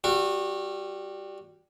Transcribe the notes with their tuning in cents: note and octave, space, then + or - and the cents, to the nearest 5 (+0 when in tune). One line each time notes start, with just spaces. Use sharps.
G3 +0 F#4 -25